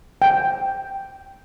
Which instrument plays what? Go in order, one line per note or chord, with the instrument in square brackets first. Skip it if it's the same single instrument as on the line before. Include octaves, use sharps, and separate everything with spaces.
[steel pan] G5